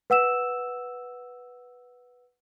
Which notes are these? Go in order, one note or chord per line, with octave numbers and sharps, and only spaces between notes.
B4 F#5 E6 E7